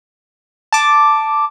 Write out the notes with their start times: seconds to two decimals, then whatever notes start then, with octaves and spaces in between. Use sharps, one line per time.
0.72 A5 D6